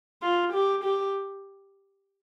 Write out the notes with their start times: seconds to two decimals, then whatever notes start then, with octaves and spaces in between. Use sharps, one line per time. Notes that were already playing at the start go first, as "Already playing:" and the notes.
0.22 F4
0.53 G4
0.84 G4